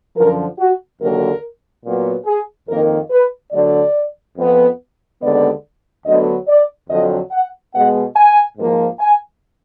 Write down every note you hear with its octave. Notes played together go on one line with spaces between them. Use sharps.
F#2 D3 F3 A#4
F#4
D#2 D3 F#3 A#3 A#4
A#2 F#3 B3
G#4
F2 D#3 A#3 A#4
B4
D2 D3 F#3 D5
F2 F3 B3
D#2 D3 G#3 B3 D5
D2 D3 F#3 B3 D#5
D5
F2 D3 F#3 D#5
F#5
B2 G#3 B3 F#5
G#5
G#2 F3 A#3
G#5